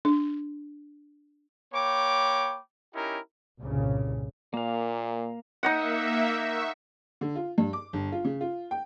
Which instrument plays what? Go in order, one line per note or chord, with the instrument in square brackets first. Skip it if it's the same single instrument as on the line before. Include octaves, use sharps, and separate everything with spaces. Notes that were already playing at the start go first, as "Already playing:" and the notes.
[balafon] D4
[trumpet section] A#3 C#5 G5 B5 D6
C#4 D#4 E4 G4 A#4
[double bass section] C2 G2 A#2 C#3
[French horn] A#2 [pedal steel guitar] A#3 F5
[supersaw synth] A#3 E5 [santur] D#4 D#5 F#5
[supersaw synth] E5 C#6
[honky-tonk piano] D3
F4
G2
D6
G1
F4
C#3
F4
G5